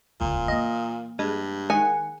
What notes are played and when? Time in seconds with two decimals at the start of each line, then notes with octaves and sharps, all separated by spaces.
0.21 D#1 C#2 A#2
0.48 E3 A#3 D#5
1.19 G2 G#3
1.70 D#3 G#3 F#5 G#5